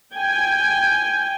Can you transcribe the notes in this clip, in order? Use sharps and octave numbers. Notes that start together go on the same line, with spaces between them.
G5 G#5